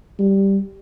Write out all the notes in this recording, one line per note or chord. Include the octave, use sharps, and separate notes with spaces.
G3